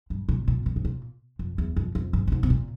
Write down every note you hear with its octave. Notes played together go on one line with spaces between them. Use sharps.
G2
A#2
A#2
A#2
G#2
A#2
F2
E2
F2
F2
G#2
A#2
G#2
C3
A#2